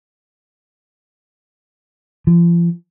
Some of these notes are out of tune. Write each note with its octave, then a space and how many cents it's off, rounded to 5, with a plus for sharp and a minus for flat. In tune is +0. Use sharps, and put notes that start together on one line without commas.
F3 -35